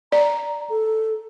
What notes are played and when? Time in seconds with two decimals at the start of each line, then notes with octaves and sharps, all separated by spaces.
0.12 D5 A#5
0.70 A4